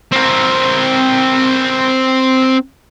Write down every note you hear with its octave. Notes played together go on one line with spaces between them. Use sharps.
C4 A#4